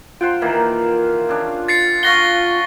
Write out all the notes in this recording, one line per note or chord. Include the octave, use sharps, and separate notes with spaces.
F4 C5 F#5 G5
D#3 E3 A#3
C#3 D4
A6 C7 C#7
F#4 F5 C#6 A#6 G7